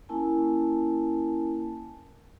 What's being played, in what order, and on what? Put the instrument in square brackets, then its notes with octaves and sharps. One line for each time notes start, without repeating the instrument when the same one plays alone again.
[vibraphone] A#3 C#4 E4 A#4 G#5 A5